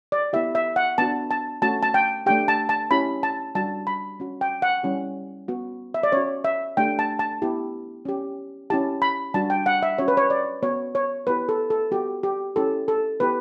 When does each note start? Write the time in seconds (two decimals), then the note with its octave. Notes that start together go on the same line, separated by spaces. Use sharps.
0.12 D5
0.33 B3 E4 G4 E5
0.55 E5
0.76 F#5
0.98 B3 D4 F#4 A5
1.31 A5
1.62 A3 C#4 F#4 A5
1.83 A5
1.94 G5
2.26 A3 D4 G4 G5
2.48 A5
2.69 A5
2.91 C#4 E4 G4 B5
3.23 A5
3.55 G3 D4 F#4 A5
3.87 B5
4.20 C#4 F#4
4.41 G5
4.62 F#5
4.83 G3 C#4 E4 G4
5.48 B3 F#4
5.94 E5
6.03 D5
6.12 C#4 F#4 C#5
6.44 E5
6.77 A3 D4 G4 G5
6.99 A5
7.19 A5
7.42 B3 E4 G4
8.05 C#4 G4
8.70 C#4 E4 G4 A5
9.02 B5
9.34 G3 D4 F#4 A5
9.50 G5
9.66 F#5
9.83 E5
9.98 C#4 F#4 C#5
10.08 B4
10.17 C#5
10.30 D5
10.63 B3 F#4 C#5
10.95 C#5
11.27 B3 E4 G4 B4
11.49 A4
11.70 A4
11.91 B3 F#4 G4
12.23 G4
12.56 C#4 E4 G4 A4
12.88 A4
13.20 B3 E4 G4 B4